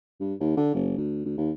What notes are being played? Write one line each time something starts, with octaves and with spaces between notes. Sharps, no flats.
G2
D#2
D3
F#1
D2
D2
D#2